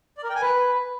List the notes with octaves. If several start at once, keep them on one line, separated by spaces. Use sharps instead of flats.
D5
A#4
G5
G#5
B4